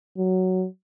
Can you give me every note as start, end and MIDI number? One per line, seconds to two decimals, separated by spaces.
0.17 0.66 54